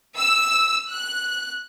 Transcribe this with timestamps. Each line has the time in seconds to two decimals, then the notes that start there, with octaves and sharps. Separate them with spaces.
0.17 E6
0.91 F#6